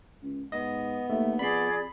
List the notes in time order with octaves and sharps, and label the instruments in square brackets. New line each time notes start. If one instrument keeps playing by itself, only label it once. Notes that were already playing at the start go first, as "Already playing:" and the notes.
[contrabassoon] C#2
[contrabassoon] G#2 [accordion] B3 [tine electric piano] D#5
[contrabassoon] D#2 [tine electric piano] A3
[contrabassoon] F2 [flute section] G#4 D5 [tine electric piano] B5 C7